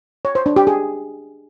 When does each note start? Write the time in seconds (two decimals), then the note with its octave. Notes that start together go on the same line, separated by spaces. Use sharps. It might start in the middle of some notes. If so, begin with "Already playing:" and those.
0.25 C#5
0.35 C5
0.46 D4
0.56 G4
0.67 G#4